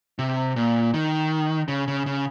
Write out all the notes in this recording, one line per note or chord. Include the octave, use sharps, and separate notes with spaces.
C3
A#2
D#3
C#3
C#3
C#3